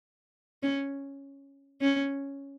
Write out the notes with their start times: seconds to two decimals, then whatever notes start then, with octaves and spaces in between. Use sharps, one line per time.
0.63 C#4
1.81 C#4